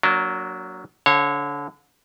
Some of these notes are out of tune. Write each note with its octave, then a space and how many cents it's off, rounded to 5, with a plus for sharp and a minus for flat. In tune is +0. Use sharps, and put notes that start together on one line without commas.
F#3 +0 A#3 +0 D4 -30
D3 -30 C#5 -20 F5 +0